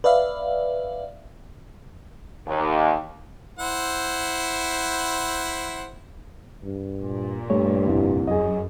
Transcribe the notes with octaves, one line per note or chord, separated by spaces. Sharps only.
B4 D5 E5 F5
D#2
E4 C5 F#5
G2
A#2
G2 G3 A3 C#5
C2 F2
F#2 G#4 D#5